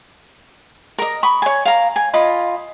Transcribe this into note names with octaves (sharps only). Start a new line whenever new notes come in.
A#4 D#5
B5 C#6 D#6
C#5 G#5
F5 A#5
G#5
F4 D#5 B5